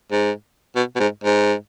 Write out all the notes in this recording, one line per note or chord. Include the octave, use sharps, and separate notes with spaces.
G#2
B2
B2
G#2
G#2